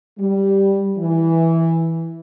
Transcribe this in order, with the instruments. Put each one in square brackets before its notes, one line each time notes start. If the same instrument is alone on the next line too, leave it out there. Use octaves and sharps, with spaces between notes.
[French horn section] G3
E3